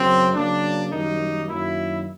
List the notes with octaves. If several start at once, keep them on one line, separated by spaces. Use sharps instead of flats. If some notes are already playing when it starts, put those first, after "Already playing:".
Already playing: F#2 C#3 F#3 C4
C#3 F#3 A#3 D4
F#2 D#3 G3 A#3 D#4
F#2 D#3 F#3 A#3 E4